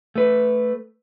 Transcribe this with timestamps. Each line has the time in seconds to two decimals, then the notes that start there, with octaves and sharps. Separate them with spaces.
0.16 A3 B4